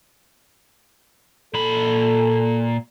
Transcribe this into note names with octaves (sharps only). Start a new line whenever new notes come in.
A#2 A4 B5